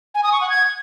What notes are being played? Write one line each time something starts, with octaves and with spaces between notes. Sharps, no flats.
G#5
D#6
C#6
F#5
G#6